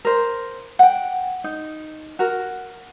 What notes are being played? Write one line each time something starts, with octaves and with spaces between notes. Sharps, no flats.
A#4 C5
F#5 G5
D#4
F#4 A#4